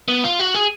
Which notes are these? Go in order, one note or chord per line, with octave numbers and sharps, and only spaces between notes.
B3
F4
F#4
G#4